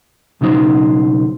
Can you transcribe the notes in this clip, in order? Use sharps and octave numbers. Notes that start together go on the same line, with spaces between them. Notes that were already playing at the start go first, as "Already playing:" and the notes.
B1 C#3 F#3 D#4 C5